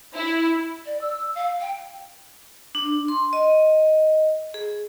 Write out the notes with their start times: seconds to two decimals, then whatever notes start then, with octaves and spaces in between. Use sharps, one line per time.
0.13 E4
0.86 D5
1.01 E6
1.35 F5
1.61 G5
2.75 D4
3.08 C6
3.33 D#5
4.54 G#4